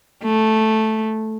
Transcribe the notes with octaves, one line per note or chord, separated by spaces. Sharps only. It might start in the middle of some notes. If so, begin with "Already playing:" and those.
A3